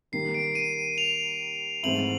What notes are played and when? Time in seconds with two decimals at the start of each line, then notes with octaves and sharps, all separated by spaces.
0.12 D#3 G3 A#3 C7
0.34 D7
0.55 D#7
0.98 F7
1.83 G#2 E3 A3 C4 E4 F#7